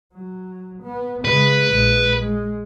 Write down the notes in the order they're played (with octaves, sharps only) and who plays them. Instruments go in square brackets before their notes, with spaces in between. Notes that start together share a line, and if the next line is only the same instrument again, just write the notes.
[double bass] F#3
B3
[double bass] C#3 G#3 [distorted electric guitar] B4
[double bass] A#1 G#3
G#3